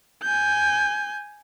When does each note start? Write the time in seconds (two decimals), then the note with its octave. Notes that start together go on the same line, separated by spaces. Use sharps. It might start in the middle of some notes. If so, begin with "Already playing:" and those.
0.23 G#5 G6